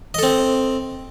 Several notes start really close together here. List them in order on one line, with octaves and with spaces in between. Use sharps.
D#5 A4 C4